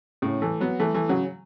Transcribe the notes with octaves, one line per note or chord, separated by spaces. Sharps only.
A2 C#3
E3 A3
F#3 B3
E3 A3
E3 A3
C#3 F#3